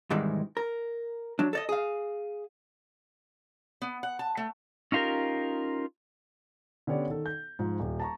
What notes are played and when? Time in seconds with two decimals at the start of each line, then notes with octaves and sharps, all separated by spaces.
0.10 G#2 C3 D#3 E3 G3 G#3
0.57 A#4
1.39 F#3 D4
1.53 A4 D5 D#5
1.69 G#4 F5
3.82 B3
4.03 F#5
4.19 A5
4.37 A3
4.92 C#4 D#4 F4 G4 A#4
6.87 D3 B3 C#4 G4 C#5 D5
7.10 D#3 A4
7.26 G6
7.59 G#2 F3
7.80 D#1
8.00 A5 A#5 C#6